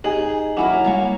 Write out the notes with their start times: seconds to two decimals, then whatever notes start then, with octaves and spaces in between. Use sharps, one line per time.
0.04 D#4 G4 G#4 G#5 F#7
0.57 F#3 C#4 E4 A#4 G#5 D6
0.84 G3 G#3 A#3 F5 C#6